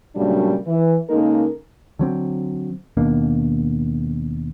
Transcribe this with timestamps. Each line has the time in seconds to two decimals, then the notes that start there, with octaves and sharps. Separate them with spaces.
0.15 A#2 C#3 F#3 G3 A3 D4
0.67 E3
1.10 C#3 G#3 A#3 D#4 A4 A#4
1.99 D3 F#3 C4
2.97 D#2 B2 A#3 D4